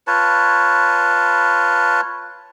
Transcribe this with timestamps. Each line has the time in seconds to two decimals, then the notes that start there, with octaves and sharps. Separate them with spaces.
0.07 F4 B4 C#5 A5